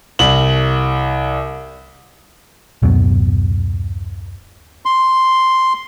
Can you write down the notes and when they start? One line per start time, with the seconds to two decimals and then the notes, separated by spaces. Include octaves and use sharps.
0.19 C2 F#7
2.82 D1 F#2 B2
4.85 C6